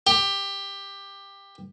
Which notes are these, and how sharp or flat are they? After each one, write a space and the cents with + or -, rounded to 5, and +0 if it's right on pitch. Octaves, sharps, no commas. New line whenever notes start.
G4 +15